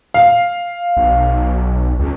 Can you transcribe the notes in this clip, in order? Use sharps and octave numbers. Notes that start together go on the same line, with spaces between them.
F5
B1
C#2